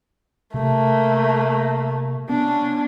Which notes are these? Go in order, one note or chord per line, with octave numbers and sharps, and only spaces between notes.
C3 A3 A#3
B3 C#4 D4